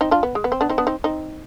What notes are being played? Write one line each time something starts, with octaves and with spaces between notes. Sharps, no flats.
C4 D#4
D4 F4
B3
G#3
B3
C4
B3 D4
C4 D#4
B3 D4
C4 D#4
C4 D#4